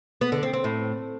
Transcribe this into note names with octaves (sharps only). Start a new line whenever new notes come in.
B3
D3
C4
C4
A2